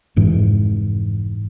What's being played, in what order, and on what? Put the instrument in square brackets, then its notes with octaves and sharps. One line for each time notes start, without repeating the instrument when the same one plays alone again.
[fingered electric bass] F1 G#2 E3